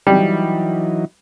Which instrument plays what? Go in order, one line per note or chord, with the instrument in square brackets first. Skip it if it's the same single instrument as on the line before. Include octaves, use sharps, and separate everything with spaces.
[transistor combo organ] E3 F#3 D#4 [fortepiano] G3